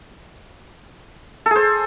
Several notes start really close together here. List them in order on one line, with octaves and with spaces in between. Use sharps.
A4 G#4 C5